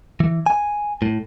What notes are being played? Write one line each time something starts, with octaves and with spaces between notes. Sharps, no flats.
E3
G#5
A2